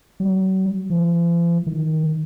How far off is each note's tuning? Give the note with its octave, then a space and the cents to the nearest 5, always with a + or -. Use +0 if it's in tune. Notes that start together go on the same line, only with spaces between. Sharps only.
F#3 +40
F3 -45
D#3 +10